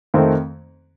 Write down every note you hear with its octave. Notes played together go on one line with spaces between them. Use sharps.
F2 D#3 A3 C4